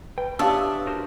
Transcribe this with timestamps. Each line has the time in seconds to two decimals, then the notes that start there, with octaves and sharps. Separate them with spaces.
0.18 B4 G5
0.39 D4 G4 C#5 E5 F5 A5 D#6 E6
0.87 F#4 A#4 C5